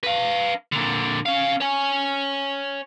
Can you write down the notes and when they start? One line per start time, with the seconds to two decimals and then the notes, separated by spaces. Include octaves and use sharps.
0.04 B4 F5
0.72 A#2 D3
1.26 C#4 F5
1.61 C#5 G#5